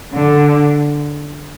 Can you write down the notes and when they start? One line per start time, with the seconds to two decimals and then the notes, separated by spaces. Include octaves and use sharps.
0.13 D3